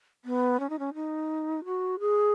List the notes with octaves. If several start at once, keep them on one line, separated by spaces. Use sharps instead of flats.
B3
C#4
D#4
C#4
D#4
F#4
G#4